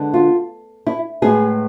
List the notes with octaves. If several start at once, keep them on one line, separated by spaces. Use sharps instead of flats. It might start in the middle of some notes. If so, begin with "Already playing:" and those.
Already playing: D3 G#3 B3
F4
E4
A2 G#3 B3 G#4